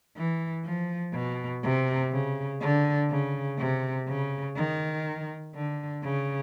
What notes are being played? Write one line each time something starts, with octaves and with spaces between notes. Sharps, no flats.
E3
F3
B2
C3
C#3
D3
C#3
C3
C#3
D#3
D3
C#3